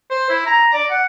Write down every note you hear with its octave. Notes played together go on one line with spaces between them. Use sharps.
C5
E4
A#5
D5
F#5